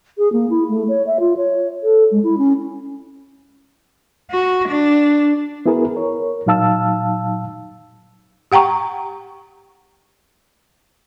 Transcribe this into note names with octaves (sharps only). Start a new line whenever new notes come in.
G#4
A#3
E4
A3
C#5
E5
F4
C#5
A4
G#3
E4
C#4
F#4
D4
B3 E4 F#4 G#4 A#4 B4
A#4 C#5
A#2 F#3 D#4 F5 A5 E6
G4 F#5 G5 A#5 C#6